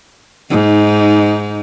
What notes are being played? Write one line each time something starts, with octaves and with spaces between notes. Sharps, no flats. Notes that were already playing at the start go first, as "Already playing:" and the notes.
G#2 D#4